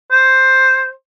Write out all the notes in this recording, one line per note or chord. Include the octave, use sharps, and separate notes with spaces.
C5